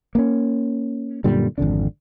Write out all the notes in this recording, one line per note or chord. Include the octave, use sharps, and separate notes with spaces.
A#3 B3 C#4
F#2 A#2 D3 G3
G#1 F2 D3 D4